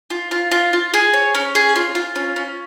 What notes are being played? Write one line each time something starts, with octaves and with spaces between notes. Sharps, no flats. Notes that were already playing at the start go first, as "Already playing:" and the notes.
F4
F4
F4
F4
G#4
C#5
C#4
G#4
F4
F4
C#4
C#4